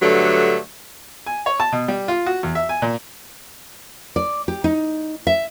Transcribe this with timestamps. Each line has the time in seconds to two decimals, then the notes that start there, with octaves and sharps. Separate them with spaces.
0.01 G2 D3 F#3 A3
1.26 G#5
1.46 C#5
1.60 A5
1.72 B2
1.88 G3
2.08 F4
2.26 F#4
2.43 E2
2.55 E5
2.69 G#5
2.82 A#2
4.16 D5
4.48 G4
4.64 D#4
5.27 E5